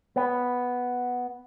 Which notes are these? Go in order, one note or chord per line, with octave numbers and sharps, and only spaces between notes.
B3